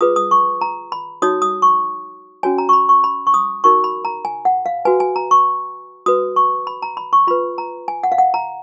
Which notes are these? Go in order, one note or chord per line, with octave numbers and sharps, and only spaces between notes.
F4 G#4 B4 D#6
D#6
C#6
A#5
B5
D#4 F#4 C#5 D#6
D#6
C#6
C#4 F#4 C#5 G#5
A#5
C#6
B5
C#6
B5
C#6
D#6
D#4 F#4 A#4 C#6
B5
A#5
G#5
F#5
F5
F#4 B4 G#5
G#5
A#5
C#6
F#4 B4 D#6
C#6
B5
A#5
B5
C#6
F4 B4 B5
A#5
G#5
F#5
F5
F#5
A#5